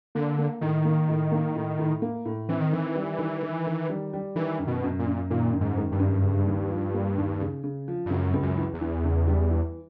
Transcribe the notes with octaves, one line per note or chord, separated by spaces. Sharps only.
D3 A#3
A#3
A2 D#3
A#3
A2
A#3
A2
A2
A#3
A2
E3 C4
D#3
D#3 E3
G3
D#3
D#3
D#3
G3
G3
D#3 E3
F#2
B2
F#2
A#2
F#2
A#2 D#3
F#2
G#2
D#3
G2
F#2
C#3
D#2
F3
A#3
D#2
C#3
C#3
F3
G2
C#2 F#2
C#2
F#2
E3
E2
E3
C#3
G3
E3